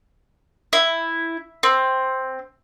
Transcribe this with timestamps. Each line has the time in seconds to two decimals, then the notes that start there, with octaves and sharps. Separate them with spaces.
0.73 E4
1.63 C4